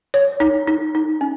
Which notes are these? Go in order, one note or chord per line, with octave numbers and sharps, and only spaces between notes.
C#5
D#4
D#4
D#4
C#4